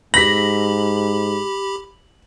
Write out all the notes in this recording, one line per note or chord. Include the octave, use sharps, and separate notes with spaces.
G#2 G4 B5 A#6 B6 F#7